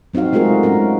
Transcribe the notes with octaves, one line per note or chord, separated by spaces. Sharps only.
F#3 C4 D#4 F#4 F5
G#3 A3 F4 F#4 G#4 A#4
G#3 C#4 F#4 A#4